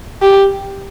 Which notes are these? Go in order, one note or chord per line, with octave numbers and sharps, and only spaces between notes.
G4